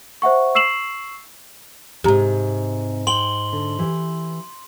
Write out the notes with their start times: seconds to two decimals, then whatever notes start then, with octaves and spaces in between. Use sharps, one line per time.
0.22 C5 E5 F#5 C#6
0.55 C#6 E6 C7 E7 F#7
2.04 F2 G#2 C3 G4 A#5
3.07 G5 C6 F#7 G7
3.53 D3
3.79 E3 G4